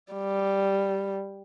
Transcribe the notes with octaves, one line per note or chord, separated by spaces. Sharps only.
G3